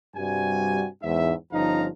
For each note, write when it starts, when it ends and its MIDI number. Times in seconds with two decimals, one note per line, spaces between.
0.16 0.87 43
0.16 0.87 48
0.16 0.87 55
0.16 0.87 66
0.16 0.87 80
1.02 1.32 40
1.02 1.32 44
1.02 1.32 76
1.52 1.87 31
1.52 1.87 53
1.52 1.87 61
1.52 1.87 63
1.52 1.87 77
1.52 1.87 82